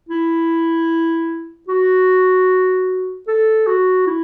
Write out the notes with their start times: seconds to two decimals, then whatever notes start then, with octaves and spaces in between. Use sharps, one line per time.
0.09 E4
1.68 F#4
3.28 A4
3.67 F#4
4.07 E4